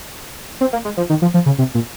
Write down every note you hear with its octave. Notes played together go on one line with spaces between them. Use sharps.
C4
A#3
G#3
F3
D#3
F3
F3
C#3
C3
A#2